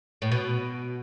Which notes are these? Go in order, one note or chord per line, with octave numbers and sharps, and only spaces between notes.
A2
B2